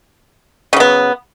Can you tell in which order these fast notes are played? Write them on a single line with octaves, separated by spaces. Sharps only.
C#3 F#3 B3